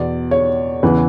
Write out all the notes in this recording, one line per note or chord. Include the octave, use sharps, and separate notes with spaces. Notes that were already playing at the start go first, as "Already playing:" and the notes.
Already playing: E2 B2 D5
C#5
E2 C#3 E3 B4